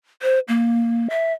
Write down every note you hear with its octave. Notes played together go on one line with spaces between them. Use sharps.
C5
A#3
E5